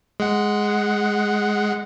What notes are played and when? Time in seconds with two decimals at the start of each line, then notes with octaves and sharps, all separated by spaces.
0.20 G#3 F#5